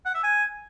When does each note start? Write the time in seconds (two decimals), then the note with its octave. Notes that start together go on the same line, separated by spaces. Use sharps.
0.06 F#5
0.14 E5
0.23 G#5